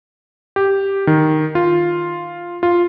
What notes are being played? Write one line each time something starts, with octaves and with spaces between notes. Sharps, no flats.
G4
D#3
F4
F4